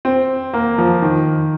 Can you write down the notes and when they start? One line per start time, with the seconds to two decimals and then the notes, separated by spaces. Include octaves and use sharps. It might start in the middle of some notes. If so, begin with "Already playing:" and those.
0.05 C4
0.54 A#3
0.78 F3
1.02 D#3